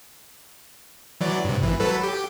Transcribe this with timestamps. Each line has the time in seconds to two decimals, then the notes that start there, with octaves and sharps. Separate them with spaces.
1.21 E3 F#3 D5
1.45 G2 C3
1.62 G#1 E3
1.80 F#3 A4 B4
2.03 G4